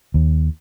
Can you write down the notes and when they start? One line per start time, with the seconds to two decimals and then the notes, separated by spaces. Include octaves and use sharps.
0.14 D#2